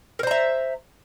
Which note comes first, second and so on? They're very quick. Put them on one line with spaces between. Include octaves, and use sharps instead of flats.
A#4 C5 A#5 E5